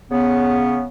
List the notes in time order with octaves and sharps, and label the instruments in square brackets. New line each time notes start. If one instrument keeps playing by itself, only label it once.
[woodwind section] C#3 B3